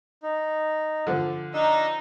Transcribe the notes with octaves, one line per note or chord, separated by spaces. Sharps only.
D#4
D3 F3
D4 D#4 D#5 E6